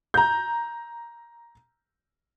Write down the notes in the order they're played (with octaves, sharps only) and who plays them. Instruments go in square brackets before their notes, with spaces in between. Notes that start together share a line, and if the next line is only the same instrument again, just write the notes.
[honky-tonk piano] A#5 G6